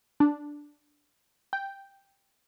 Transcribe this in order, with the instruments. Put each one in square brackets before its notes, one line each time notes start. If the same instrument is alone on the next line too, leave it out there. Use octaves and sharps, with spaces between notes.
[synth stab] D4
G5